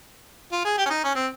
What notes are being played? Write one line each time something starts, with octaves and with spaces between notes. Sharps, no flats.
F4
G#4
G4
C#4
D#4
C#4
C4